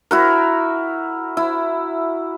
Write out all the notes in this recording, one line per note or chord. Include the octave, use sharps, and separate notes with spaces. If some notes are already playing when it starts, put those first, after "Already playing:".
E4 F#4 A#4
E4